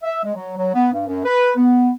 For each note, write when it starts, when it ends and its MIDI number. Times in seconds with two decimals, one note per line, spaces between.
0.03 0.21 76
0.23 0.34 56
0.35 0.54 54
0.56 0.71 54
0.74 0.88 59
0.92 1.03 43
1.07 1.20 42
1.24 1.51 71
1.56 1.89 59